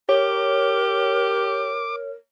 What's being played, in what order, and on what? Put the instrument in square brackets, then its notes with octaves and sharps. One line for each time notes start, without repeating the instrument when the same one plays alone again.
[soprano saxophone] G4 [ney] A#4 [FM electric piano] C#5 [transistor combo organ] D6